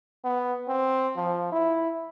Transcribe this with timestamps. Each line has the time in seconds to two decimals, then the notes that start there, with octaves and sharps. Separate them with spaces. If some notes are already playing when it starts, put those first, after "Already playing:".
0.24 B3
0.68 C4
1.16 F3
1.52 E4